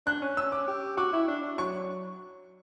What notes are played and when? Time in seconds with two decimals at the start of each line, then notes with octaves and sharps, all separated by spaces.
0.06 D4 F#6
0.22 C#4
0.37 E6
0.52 D6
0.68 G4
0.97 F#4 D6
1.13 E4
1.28 D4
1.43 D4
1.58 F#3 C#6